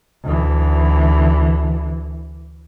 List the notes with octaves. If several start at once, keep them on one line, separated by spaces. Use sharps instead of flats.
D2 E3